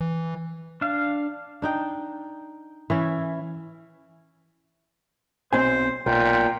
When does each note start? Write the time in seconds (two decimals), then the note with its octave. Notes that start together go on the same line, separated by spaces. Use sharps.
0.01 E3
0.81 D4 F5
1.62 D4 D#4 G5
2.90 E3 C#4 E4
5.53 B1 C4 C5 G#5
6.06 B1 A#2 G5